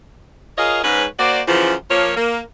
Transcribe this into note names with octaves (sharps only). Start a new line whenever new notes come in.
F4 G#4 A#4 C#5 D#5 F5
G#2 C#4 B4
A#3 F#4 C5 D5
F#2 C#3 E3 F3
F3 A#3 C#5
A#3